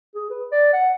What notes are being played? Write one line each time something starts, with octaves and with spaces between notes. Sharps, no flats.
G#4
B4
D5
F#5